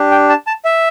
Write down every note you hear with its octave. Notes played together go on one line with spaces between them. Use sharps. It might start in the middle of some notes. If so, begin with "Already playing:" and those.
Already playing: D4 G4
G5
A5
A5
E5